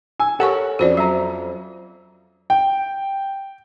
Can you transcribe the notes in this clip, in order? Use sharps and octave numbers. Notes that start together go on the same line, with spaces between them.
G#5 E6
G4 A4 A#4 C#5 F#5 C#6
F2 C#4 F#4 C5 D5
F#3 E5 A#5
G5